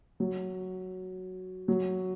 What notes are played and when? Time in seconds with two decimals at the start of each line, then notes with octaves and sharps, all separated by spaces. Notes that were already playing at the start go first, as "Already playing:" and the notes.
0.20 F#3
1.68 F#3